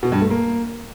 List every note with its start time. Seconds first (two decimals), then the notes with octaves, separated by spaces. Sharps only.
0.03 B2
0.12 G2
0.21 A3
0.30 A#3